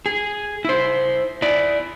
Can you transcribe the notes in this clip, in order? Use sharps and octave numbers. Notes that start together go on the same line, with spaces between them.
G#4
E4 C5
E4 D5